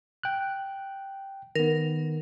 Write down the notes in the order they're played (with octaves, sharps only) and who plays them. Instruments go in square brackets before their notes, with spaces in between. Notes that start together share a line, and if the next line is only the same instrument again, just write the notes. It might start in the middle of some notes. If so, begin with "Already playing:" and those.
[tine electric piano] G5 F#6
[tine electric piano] D#3 B3 [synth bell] A#4